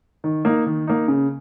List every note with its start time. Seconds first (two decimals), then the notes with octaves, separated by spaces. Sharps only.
0.24 D#3
0.45 A#3 D#4
0.66 D#3
0.87 A#3 D#4
1.08 C#3